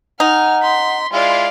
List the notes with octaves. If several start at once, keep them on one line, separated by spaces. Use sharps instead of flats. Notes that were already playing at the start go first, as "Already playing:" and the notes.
D#4 F#5 G#5 F6
C6 B6
G#3 E4 F4 D5 F5